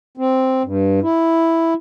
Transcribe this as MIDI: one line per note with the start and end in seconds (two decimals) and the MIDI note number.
0.17 0.62 60
0.63 1.00 43
1.02 1.74 64